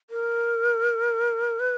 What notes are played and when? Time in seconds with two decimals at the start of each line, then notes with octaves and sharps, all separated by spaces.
0.10 A#4
1.59 B4